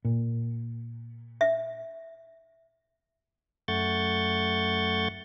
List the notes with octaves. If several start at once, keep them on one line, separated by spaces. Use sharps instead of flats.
A#2
E5
F#2 A3 F#5 C#6 G6 A6